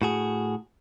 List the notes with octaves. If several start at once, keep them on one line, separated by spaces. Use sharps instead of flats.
A2 F#4 G#4